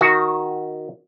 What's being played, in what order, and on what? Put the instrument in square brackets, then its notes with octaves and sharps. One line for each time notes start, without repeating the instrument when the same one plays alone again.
[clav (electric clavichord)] D#3 F#4